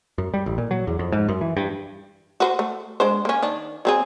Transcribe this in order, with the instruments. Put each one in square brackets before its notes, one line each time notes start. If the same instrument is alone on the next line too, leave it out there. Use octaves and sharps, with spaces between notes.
[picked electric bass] F#2
G3
A1
A#2
F#3
E2
F2
G#2
F#2
E3
G2
[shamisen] F#4 B4 C5
A3
G#3 D4 C5
A#3 C#4
D#3 D4
F#3 C4 G#4